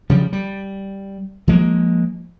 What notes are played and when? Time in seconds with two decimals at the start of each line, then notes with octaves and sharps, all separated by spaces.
0.10 C#3 F3 G3
0.33 G3
1.48 F3 G#3 A#3